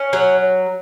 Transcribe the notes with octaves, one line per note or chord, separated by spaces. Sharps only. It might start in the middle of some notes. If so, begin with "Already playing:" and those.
Already playing: C#4
F#3